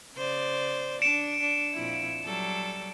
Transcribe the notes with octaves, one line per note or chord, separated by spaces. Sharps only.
C#3 C5 D5
D4 C#7 D7 E7
D4
F2 A#2 E4
F#3 G3 A4